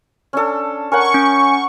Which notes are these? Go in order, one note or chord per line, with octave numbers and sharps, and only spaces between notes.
C#4 D4 A4
A#4 C#5 F#5 G#5 C#6
C#4